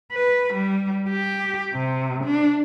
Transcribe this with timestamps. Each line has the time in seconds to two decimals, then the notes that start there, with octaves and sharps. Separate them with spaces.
0.13 B4
0.54 G3
1.10 G4
1.74 C3
2.25 D4